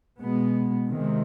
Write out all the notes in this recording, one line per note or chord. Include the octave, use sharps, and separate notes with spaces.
B2 G#3 B3
C3 D#3 G#3